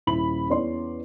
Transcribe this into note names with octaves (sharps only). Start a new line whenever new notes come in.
D#1 E4 B5 F#7
E2 C#4 D5 C6